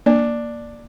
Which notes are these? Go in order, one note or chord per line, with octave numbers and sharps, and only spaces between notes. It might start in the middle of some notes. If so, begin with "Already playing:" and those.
A#3 D4